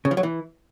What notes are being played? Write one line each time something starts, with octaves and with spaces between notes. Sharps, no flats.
C#3
F3
F#3
E3